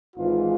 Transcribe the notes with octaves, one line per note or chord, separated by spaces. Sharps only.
G#1 G#2 E3 F4